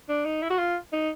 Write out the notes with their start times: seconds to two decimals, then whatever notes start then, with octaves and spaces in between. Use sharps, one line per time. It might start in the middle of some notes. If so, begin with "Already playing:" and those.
0.09 D4
0.25 D#4
0.42 E4
0.50 F#4
0.58 F4
0.93 D#4